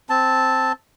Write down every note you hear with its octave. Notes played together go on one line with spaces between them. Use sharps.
C4 A5